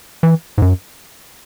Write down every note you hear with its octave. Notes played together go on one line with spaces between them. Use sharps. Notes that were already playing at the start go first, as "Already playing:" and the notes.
E3
G#2
F#2